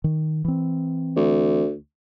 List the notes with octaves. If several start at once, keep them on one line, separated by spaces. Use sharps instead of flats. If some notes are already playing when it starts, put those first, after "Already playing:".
D#3
E3 C4
D2